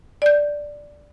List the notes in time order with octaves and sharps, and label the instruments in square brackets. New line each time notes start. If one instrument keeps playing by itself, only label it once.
[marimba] D5 G6